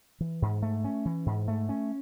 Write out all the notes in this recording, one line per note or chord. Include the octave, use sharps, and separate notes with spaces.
E3
G#2
A3
C#4
E3
G#2
A3
C#4